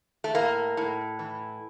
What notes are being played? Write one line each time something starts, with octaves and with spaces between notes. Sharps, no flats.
A3
A2 A#3
A2
E3